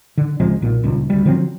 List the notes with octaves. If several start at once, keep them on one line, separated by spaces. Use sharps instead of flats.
D3
C#2 C3 F3 G#3
B1 A#2
D#1 C#2
D2 G3
D3 F3 F#3 C4